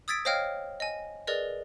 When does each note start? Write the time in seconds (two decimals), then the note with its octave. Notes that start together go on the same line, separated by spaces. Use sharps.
0.08 D#6 E6 G#6 A6 B6 D7
0.25 C5 C#5 D#5 F5 G5 F6
0.80 D#5 G#5
1.27 G#4 A#4 B4 D5 D#5